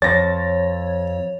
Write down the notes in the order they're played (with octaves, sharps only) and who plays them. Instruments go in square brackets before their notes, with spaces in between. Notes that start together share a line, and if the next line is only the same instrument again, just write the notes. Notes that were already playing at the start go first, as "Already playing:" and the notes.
[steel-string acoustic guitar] F2 [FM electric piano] C#5 [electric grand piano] A6 A#6